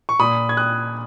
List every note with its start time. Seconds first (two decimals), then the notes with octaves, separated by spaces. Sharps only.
0.09 C#6
0.20 A#2 B5 D#6
0.49 G#6
0.57 D#6 F#6